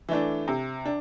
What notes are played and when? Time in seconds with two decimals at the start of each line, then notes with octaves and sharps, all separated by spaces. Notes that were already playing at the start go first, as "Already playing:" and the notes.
0.09 E3 A3 D4
0.48 C3
0.85 D4